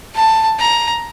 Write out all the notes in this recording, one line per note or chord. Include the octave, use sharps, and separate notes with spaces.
A5
A#5